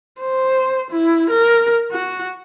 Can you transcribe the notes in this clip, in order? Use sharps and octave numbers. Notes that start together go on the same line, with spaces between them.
C5
E4
A#4
F#4